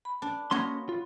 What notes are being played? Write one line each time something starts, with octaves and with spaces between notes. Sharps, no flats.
B5
D4
A#3 C#4 F#4 C#5 D#5 C6
F4